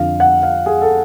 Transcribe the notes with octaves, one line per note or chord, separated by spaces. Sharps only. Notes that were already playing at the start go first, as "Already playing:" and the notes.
Already playing: F2 D3 F5
F#5
F5
G#4
A4